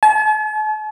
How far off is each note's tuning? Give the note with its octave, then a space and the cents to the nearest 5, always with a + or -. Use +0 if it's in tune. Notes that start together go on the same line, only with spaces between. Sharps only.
A5 -45